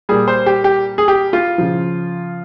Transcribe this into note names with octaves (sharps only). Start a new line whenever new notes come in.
A#2 G3 G#4
C5
G4
G4
G#4
G4
F4
C#3 F3